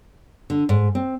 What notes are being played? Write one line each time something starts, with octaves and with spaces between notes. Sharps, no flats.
D3
G#2
C4